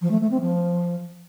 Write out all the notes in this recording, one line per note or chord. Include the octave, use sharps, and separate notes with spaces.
F3
A3
A3
C4
F3